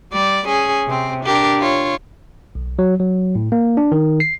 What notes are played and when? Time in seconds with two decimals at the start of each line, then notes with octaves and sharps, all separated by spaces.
0.12 G3 D5
0.47 C#4 G#4
0.87 C3 C4
1.25 D4 G4 A#4
1.59 F4 C#5
2.55 B1
2.79 F#3
3.00 F#3
3.35 A2
3.52 A#3
3.77 D4
3.92 D#3
4.20 C7